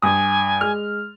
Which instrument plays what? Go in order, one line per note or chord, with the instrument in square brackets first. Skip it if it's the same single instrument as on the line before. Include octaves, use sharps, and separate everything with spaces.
[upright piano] G2 D#6 [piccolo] G#5
[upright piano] G#3 F6